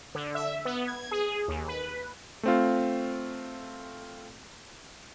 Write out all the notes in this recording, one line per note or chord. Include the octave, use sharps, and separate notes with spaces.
D3
E5
B3
G#6
G#4
D#2
B4
A3 C4 F4